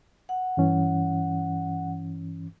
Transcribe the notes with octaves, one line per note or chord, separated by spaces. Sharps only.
F#5
G2 E3 C#4